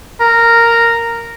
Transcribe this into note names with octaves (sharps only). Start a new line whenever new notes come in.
A#4